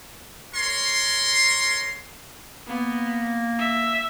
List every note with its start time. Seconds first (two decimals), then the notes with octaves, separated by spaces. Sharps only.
0.55 A#4 C#5 C6
2.67 A#3 B3
3.58 E5